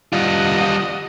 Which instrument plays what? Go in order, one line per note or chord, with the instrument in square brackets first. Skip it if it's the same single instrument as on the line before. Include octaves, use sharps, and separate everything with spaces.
[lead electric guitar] G3 F4 [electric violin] D#5 F#5